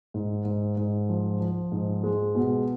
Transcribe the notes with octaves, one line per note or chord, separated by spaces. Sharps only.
G#2
G#2
G#2
F3
F3
G#2
G#3
B2